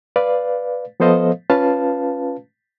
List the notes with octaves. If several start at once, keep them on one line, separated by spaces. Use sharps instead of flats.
B4 D5 F5
F3 B3 A4 C5 D#5 F5
C#4 F4 B4 F5 A5